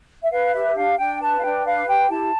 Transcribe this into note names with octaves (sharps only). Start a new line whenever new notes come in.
E5
B4 F5
G4 E5
D4 F5
D4 G5
B4 A5
F5
D4 G5
B4 F5
G4 G5
E4 A5